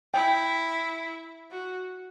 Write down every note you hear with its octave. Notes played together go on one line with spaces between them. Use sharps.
E4 G5
F#4